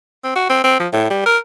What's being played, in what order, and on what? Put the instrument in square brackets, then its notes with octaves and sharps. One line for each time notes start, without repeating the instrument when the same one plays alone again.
[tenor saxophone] C4
F#4
C4
C4
F3
A2
G3
A#4